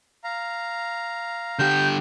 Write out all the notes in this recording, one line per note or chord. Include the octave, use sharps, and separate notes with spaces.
F5 A#5
D3 G4 G6